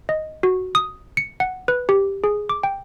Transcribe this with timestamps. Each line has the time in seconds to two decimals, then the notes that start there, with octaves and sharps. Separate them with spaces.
0.09 D#5
0.43 F#4
0.75 D#6
1.17 C#7
1.40 F#5
1.68 B4
1.89 G4
2.24 G#4
2.49 D6
2.63 G5